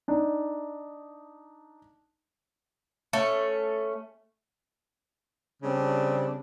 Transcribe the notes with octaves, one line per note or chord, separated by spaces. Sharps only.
D4 D#4
A3 C#4
C#3 G3 C4 D4